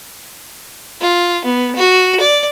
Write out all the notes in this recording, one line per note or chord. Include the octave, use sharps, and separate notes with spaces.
F4
B3
F#4
D5